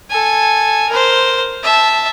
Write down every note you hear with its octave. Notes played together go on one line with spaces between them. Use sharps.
A4 G#5
A#4 C5
E5 A5